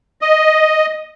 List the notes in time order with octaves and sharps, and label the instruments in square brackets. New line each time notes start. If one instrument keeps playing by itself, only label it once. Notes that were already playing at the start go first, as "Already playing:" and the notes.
[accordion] D#5